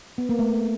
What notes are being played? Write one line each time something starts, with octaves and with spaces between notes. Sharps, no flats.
B3
A#3
A3